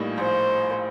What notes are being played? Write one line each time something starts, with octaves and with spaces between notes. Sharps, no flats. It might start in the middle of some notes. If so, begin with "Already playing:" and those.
Already playing: A#1 A2 G3 A#3 D#4
A#1 C5